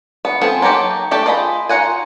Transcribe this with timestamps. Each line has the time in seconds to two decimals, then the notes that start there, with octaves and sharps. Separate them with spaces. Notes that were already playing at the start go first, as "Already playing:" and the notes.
0.25 B3
0.41 B3 C4 F4 G#4 A4
0.62 F#3 A#3 D#4 G4 A4
1.11 A3 G4 A4
1.26 F4 G#4 D#5 A#5 B5
1.69 D#4 F4 F#4 F#5 G#5